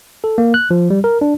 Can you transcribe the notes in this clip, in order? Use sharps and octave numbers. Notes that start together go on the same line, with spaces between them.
A4
A#3
F#6
F3
G3
A#4
D4